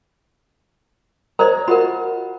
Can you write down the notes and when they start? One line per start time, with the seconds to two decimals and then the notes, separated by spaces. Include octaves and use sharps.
1.39 A#4 C5 C#5 D#5 A#5
1.68 F4 F#4 A#4 B5